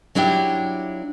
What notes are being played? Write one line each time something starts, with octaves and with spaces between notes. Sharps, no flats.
F#3 D4 E4 F4 G4